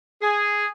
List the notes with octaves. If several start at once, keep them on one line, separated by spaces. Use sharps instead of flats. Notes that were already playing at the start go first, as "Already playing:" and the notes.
G#4